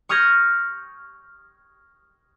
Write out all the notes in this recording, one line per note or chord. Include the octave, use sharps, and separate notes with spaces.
C#6 D#6 F6 G6 G#6 A#6